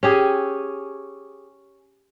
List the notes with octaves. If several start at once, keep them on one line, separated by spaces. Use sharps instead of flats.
C#4 G4 G#4